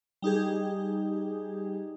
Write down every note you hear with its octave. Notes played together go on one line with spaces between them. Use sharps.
G3 D#4 G4 G#4